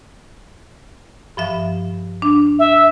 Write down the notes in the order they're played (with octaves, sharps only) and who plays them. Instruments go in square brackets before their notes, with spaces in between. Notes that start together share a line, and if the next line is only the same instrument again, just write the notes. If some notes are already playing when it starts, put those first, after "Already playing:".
[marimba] G2 F3 E5
D4
[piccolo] E5